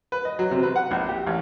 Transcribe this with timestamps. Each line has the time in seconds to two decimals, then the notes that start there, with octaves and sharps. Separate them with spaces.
0.12 B4
0.25 D#5
0.39 F#3
0.51 C3
0.63 B4
0.76 F#5
0.91 A#1
1.09 G4
1.27 A1